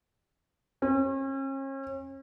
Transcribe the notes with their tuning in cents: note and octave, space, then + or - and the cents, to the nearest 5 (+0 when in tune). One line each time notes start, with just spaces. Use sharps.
C#4 -40